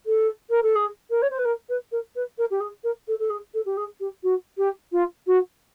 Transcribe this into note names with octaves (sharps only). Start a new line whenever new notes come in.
A4
A#4
A4
G#4
A#4
C#5
C5
B4
A#4
B4
A#4
B4
A#4
G4
G#4
A#4
A4
A4
G#4
A4
G4
G#4
G4
F#4
G4
F4
F#4